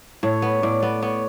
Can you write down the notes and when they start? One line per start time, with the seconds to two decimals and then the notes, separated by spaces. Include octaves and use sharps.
0.23 A2 C#5
0.42 B3
0.62 A2 D5
0.80 B3 D5
1.02 B3 C#5